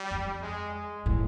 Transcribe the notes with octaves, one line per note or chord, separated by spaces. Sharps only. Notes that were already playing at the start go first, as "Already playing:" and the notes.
Already playing: G3
F2
G#3
G#3
A2